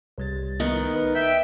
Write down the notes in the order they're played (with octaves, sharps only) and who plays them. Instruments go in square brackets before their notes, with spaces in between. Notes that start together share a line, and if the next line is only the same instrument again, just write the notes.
[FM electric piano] C2 G3 A6
[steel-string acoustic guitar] D#3 B3 D#4
[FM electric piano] B4
[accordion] E5 G5